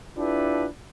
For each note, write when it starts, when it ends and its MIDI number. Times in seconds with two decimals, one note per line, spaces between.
0.18 0.65 62
0.18 0.65 64
0.18 0.65 65
0.18 0.65 67
0.18 0.65 69
0.18 0.65 71